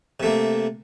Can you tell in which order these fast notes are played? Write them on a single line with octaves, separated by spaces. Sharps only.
C3 A3 A#3